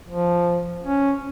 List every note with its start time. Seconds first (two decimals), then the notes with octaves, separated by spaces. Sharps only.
0.08 F3
0.84 C#4